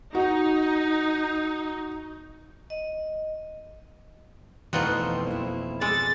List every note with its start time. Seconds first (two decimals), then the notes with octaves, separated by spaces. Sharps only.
0.15 D#4 F#4
2.70 D#5
4.73 F2 B2 E3 A3 C4 D#4 F4 F#4
5.26 A#3 E4
5.81 G#3 A4 D5 A6